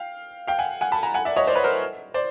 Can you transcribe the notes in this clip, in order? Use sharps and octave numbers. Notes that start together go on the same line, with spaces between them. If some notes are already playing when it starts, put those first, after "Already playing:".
Already playing: F5 G5
F5 G5
F#5 G#5
F#5 G#5
A5 B5
G#5 A#5
F#5 G#5
D5 E5
C#5 D#5
C5 D5
B4 C#5
A#4 C5
C5 D5